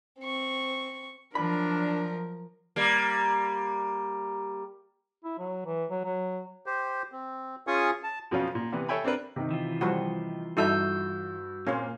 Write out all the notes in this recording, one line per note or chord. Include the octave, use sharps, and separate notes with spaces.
C4 C#6
F3 F#3 D4 A#4 B5
G3 A#3
E4
F#3
E3
F#3
F#3
G4 C5
C4
C#4 F4 G#4 G#5 C#6 D#6
A5
F2 B2 F3 F#3 C#4 F4
A#2
C3 E3 B3
A4 C#5 E5 G5 G#5 B5
C4 D4 A#4 B4
C3 D#3 D#4
E3 F4
F3 G3 F#4
G2 D#4 E4 F#4 A4 E6 G6
A#2 A#3 C4 C#4 F4 F5 G#6